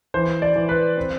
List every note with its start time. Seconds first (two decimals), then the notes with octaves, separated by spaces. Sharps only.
0.14 E3 C5
0.42 D5
0.56 E3
0.69 B4
0.97 C4